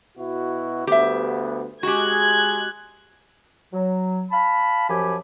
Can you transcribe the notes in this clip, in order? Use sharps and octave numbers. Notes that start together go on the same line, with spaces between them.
B2 E4 F#4
D2 G2 B3 G4 E5
G#3 F#4 G4 F#6 G#6
F#3
F5 A5 B5
F#2 F3 G4 G#5 B5